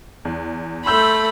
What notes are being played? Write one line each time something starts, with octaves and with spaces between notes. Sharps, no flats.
E2
A3 B5 C6 E6 G6